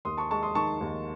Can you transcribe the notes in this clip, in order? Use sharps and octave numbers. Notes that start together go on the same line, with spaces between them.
D#2 C6 D#6
A5 C#6
G#3 A5 C#6
C6 D#6
D#3 A5 C#6
D#2